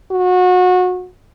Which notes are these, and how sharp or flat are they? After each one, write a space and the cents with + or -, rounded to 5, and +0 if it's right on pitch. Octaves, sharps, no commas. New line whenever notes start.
F#4 -25